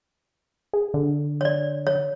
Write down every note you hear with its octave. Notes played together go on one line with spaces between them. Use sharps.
G#4
D3
C#5 D5
C#5